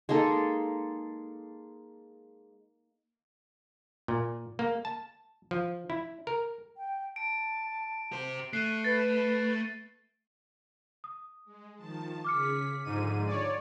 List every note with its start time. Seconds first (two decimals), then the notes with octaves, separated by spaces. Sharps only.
0.09 G#3 A#3 D#4 A4
4.08 A#2
4.59 A#3
4.85 A5
5.51 F3
5.90 E4
6.27 A#4
6.77 G5
7.16 A5 D7
8.12 G4 C5
8.53 A3 F#6 C7 D#7
8.84 B4 A6 C7
11.04 D#6
11.45 G#3
11.76 D#3 F3 A5
12.24 C#3 G#4 D6 F6 B6 C#7
12.84 G#2 D3 F3 G#3 D#7
13.27 C#5 D5